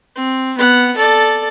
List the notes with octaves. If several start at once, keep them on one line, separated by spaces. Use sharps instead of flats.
C4
B3 F#5
A4 D5